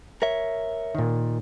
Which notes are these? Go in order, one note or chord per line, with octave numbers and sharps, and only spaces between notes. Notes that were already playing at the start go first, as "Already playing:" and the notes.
A#4 C#5 E5
A#2 D#3